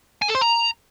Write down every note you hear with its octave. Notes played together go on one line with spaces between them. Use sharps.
G#5
A4
C5
A#5